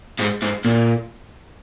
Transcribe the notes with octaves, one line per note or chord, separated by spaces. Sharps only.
G#2
G#2
A#2